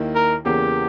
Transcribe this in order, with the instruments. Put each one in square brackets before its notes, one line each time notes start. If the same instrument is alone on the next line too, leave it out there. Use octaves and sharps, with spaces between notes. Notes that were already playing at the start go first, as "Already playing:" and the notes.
Already playing: [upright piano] D#2 D#3 A#3 E4
[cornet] A#4
[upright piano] E2 C#3 E3 A#3 [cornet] G4